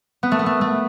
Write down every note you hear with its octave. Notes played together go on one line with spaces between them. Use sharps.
B3
A3
B3
A3
A3